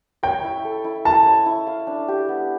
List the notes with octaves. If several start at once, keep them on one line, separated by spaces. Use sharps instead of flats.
C#5 G5
E4
A4
E4
E4 A5
C#5
E4
F5
D4
G4
B3